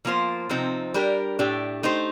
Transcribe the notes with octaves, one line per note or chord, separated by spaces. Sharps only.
F3 A#3 F4 C5
C3 F3 C4 D#4
G3 D4 G4 A#4
A2 A3 D4 G4
A3 D#4 G4 C5